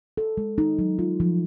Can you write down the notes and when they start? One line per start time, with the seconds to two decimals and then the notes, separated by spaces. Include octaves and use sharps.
0.17 A4
0.37 G#3
0.58 D#4
0.79 F#3
0.99 F4
1.20 F3